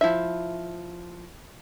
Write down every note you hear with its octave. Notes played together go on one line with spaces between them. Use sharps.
F3 E4 E5